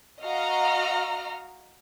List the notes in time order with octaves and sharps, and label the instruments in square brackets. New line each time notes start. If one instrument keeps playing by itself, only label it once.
[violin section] F#4 D#5 F5 A#5 F6